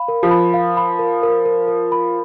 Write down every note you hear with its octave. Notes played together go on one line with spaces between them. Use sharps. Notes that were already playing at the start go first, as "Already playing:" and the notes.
Already playing: F5 B5
A#4
F3
B5
F5
B5
A#4
A#4
A#4
A#4
B5